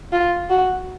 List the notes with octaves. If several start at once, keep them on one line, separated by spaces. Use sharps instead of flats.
F4
F#4